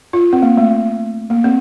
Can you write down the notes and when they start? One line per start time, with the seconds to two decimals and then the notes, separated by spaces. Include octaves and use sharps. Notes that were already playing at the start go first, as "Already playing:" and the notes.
0.13 F4
0.33 C4
0.42 A#3
0.57 A3
1.30 A#3
1.44 C4